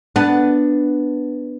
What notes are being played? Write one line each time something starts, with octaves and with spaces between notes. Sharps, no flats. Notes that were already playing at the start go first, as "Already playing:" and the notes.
B3 D4